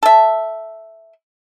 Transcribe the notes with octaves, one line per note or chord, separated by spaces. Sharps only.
A4 E5